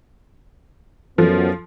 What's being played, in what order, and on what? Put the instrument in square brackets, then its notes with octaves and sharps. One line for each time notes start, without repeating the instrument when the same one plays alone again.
[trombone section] F#2 B3 [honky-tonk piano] F3 [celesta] A4